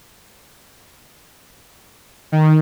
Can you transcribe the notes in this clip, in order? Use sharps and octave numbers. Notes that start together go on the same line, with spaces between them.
D#3